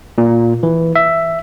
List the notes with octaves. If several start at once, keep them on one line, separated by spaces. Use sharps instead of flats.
A#2
E3
E5